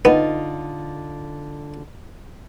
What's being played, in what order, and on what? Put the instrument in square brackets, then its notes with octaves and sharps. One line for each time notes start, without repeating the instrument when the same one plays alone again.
[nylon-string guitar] D3 D#4 F4 [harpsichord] B3